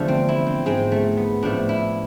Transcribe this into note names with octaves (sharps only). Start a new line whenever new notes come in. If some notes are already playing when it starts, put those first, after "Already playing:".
Already playing: E2 D3 F3 A3 D4
C4
E4
C4
G#2 G#3 C4
A3
B3
A2 F3 A3 D4
E4